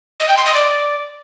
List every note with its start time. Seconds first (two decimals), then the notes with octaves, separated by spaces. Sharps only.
0.20 D#5
0.29 G5
0.37 C6
0.46 D#5
0.54 D5